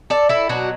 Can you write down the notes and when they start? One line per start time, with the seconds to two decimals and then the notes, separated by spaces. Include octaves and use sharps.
0.10 A4 D5
0.29 E4 A4
0.49 B2 F#3 D4 F#4